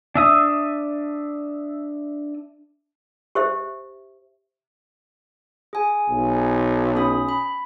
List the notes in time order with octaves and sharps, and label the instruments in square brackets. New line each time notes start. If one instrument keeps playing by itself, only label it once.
[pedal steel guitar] D4 E5 D#6
[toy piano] G4 C5 E5
[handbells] G#4 G#5
[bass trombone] B1
[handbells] C#4 B5 D#6
B5